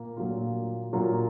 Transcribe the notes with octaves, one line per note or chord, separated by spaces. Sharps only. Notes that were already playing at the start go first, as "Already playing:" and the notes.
Already playing: A#2 A#3
A#2 F#3 A#3 F4
A#2 F#3 A#3 F4